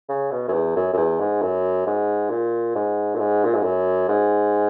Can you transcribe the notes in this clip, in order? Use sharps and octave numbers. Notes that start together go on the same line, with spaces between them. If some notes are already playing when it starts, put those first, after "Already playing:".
C#3
B2
F#2
E2
F#2
F#2
E2
G#2
F#2
G#2
A#2
G#2
A#2
G#2
A#2
G#2
F#2
G#2